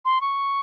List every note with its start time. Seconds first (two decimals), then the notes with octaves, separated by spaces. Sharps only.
0.05 C6
0.21 C#6